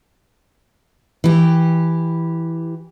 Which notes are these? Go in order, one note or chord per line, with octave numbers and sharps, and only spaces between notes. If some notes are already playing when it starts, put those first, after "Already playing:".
E3 G4